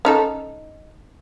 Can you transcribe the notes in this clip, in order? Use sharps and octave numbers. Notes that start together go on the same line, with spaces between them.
C#4 D#4 A4